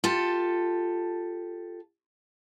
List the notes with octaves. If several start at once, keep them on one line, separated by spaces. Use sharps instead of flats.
F4 G4 A4 A5